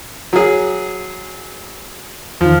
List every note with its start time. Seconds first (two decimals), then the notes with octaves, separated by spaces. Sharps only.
0.33 F#3 G#4
2.41 E2 D#3 F3